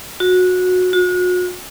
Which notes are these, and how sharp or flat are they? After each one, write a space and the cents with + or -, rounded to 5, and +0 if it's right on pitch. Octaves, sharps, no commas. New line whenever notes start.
F#4 -20
F#4 -40